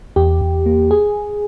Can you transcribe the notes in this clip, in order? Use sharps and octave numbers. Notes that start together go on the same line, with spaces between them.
E2 G4
E2
A#3
G#4